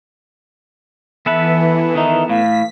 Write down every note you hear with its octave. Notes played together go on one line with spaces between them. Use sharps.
E3 B3 A4 B4 E5
D#3 D#4 E5
A2 F5 B6